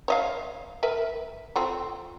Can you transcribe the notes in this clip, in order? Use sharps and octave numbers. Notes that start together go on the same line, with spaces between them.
C#5 D#5 F5
A#4 B4 E5
C4 F4 A4